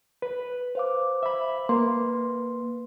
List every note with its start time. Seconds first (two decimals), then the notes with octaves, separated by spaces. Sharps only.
0.22 B4
0.75 C5 F5 D6
1.23 E5 B5
1.69 A#3 B4 C6